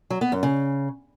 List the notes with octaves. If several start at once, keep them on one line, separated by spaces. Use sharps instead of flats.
F#3
B3
F#2
C#3